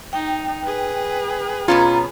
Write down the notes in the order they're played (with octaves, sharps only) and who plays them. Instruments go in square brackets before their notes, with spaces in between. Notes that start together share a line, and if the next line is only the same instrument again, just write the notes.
[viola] D#4 [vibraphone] G5
[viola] G#4 B4
[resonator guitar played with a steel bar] B2 B3 C#4 [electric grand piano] F4 [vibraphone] A#5